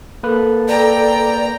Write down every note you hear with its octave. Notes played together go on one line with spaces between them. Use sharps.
A#3 A4 B4
D5 G5 A#5